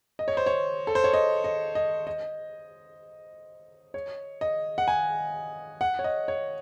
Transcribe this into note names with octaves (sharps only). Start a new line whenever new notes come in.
D#5
C#5
C5
C#5
A4
C5
C#5
D#5
D#5
D#5
D#5
C#5
D#5
F#5
G#5
F#5
C#5
D#5
C#5